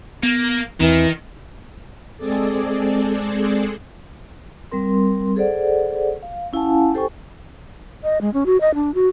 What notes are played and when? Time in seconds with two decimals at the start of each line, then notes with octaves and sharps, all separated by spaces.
0.23 A#3 B3
0.80 E2 D#3 E3 C4
2.17 G#3 C4 G#4 A4 D5
4.71 G3 C4 A#4 C6
5.36 G#4 A4 C5 D5 F#5
6.23 F5
6.53 C#4 E4 F5 F#5 G#5 A5
6.94 G4 A4 C5 G5 G#5 C#6
8.04 D#5
8.21 G#3
8.34 C#4
8.46 F#4
8.61 D#5
8.75 D4
8.94 F#4